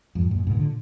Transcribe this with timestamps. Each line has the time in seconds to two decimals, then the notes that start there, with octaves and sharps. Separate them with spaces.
0.15 F2 G#2
0.31 F#2 A#2
0.47 G#2 B2
0.56 A#2 D3